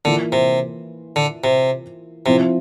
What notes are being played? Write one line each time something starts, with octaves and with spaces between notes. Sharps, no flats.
D3 E3 A#3 F4
C3
D3
C3
C3 F3 C4 E4